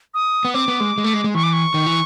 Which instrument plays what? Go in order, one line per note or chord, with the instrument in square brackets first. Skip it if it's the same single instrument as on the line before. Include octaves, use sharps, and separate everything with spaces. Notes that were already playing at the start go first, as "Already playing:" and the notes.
[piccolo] D#6
[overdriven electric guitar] B3
[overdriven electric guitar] C4 [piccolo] D6
[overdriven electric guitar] B3
G#3
G#3
A3
G#3
G#3
[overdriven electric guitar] E3 [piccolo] C#6
[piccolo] D6
C#6
[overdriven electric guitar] D#3
E3